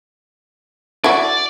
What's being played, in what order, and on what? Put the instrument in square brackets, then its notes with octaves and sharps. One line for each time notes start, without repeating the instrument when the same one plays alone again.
[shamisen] E4 F#4 [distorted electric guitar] D5